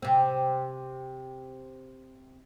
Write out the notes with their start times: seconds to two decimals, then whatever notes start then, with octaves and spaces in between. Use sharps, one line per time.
0.02 C3 C4